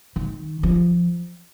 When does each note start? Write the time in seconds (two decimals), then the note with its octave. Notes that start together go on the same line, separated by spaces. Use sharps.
0.16 D#3
0.63 F3